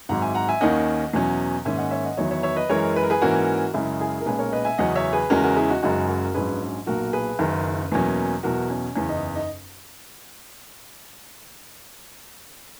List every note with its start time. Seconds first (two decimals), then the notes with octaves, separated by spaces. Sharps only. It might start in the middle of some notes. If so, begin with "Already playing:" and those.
0.09 G#1 G#2 F#3 F#5 A#5
0.21 E5 G#5
0.35 F#5 A#5
0.49 E5 G#5
0.61 D#2 D#3 A#3 C#4 D#5 F#5
1.13 E2 B2 F#3 C#4
1.65 G#2 D#3 A#3 C#4 E5 G#5
1.78 D#5 F#5
1.91 C#5 E5
2.05 D#5 F#5
2.17 E2 D#3 F#3 B3 C#5 E5
2.31 C#5 E5
2.43 C#5 E5
2.56 B4 D#5
2.69 F#2 E3 G#3 A#4 C#5
2.96 B4
3.03 A#4
3.10 G#4 B4
3.22 G#2 E3 A#3 C#4 F#4 A#4
3.74 F#2 C#3 G#3 C#4 E4 G#4
4.00 E4 G#4
4.21 A#4
4.26 B1 A#2 G#3 C#4 G#4 B4
4.39 A#4 C#5
4.52 B4 D#5
4.65 E5 G#5
4.78 E2 C#3 F#3 C#4 D#5 F#5
4.95 C#5 E5
5.13 G#4 B4
5.30 E2 C#3 G#3 C#4 F#4 A#4
5.43 F#4 A#4
5.56 E4 G#4
5.69 D#4 F#4
5.83 F#1 F#2 C#3 G#3 C#4 D#4 F#4
6.08 F#4 A#4
6.34 A#1 G#2 F#3 C#4 G#4 B4
6.86 B1 A#2 F#3 F#4 A#4
7.13 G#4 B4
7.39 F#1 F#2 D#3
7.92 E2 B2 F#3 A#3 C#4
8.43 E2 B2 F#3 F#4 A#4
8.70 C#4
8.95 F#1 E2 C#3 C#4
9.09 D#4
9.35 D#4